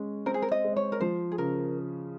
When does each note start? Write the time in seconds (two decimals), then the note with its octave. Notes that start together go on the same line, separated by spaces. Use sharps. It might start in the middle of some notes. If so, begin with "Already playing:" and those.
Already playing: G#3 C#4
0.26 C4 A#4
0.34 G#4
0.42 A#4
0.52 D#5
0.64 G#3
0.76 C#5
0.92 A#4
1.00 F3 C5
1.32 G#4
1.38 C#3 A#4